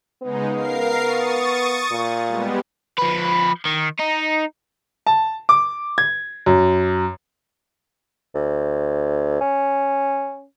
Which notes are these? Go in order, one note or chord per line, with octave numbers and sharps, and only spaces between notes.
C#3 G#3 B3 D#4
A#4 F5 C7
C#6 D#6 A6
A#2
G3 G#3 B3
F3 B4
D#3
D#4
A5
D6
G#6
F#2
D2
C#4